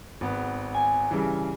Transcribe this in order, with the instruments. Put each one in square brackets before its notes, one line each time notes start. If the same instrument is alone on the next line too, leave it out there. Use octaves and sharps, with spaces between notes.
[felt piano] G#1 B3
[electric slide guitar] G#5
[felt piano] G2 C#3 E3